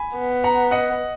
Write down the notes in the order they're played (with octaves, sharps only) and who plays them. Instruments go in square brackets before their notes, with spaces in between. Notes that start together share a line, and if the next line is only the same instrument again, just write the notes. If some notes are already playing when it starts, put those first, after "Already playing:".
Already playing: [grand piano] G#5 B5
[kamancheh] B3
[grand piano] F#5 A#5
D#5 F#5